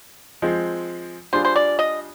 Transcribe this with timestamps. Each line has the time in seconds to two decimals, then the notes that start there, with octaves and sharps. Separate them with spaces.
0.42 F3 G#3 C4
1.33 G3 D4 F4 G#4 C5
1.45 C5
1.56 D5
1.79 D#5